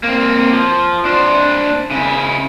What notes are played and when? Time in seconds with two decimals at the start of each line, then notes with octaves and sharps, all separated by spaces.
0.03 A#3 C4
0.53 F3
1.05 D4 C5
1.92 C#3 E4